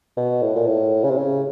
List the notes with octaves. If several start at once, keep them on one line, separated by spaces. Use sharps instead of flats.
B2
A2
A#2
A2
C#3
C3
C#3